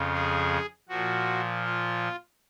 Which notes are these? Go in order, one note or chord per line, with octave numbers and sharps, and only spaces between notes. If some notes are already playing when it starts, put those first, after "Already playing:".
Already playing: F2 C#3 F3
G#4
A#2 F3 F#4
F4